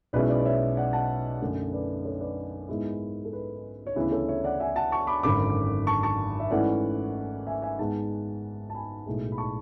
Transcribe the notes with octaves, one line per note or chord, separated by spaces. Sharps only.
B1 B2 G#3 C#4 E4 B4 D5
B4 D5
D5
C#5 E5
D5 F#5
F#5 A5
F#2 D3 A3
B4 D5
A4 C#5
B4 D5
G#2 G#3 B3 E4
A4
B4
C#5
D2 C#3 E3 B3 E4 B4
A4 C#5
C#5 E5
D5 F#5
E5 G#5
F#5 A5
A5 C#6
B5 D6
G#1 F#2 D3 B5 D6
A5 C#6
A5 C#6
E5
G#2 E3 A3 C#4 E4 D5 F#5
E5 G#5
E5 G#5
G#2 G#3 B3 F#5 A5
A5
G#5 B5
B1 A2 G#3
B5
A5 C#6